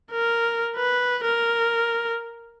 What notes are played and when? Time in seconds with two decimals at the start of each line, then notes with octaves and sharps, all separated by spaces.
0.11 A#4
0.77 B4
1.24 A#4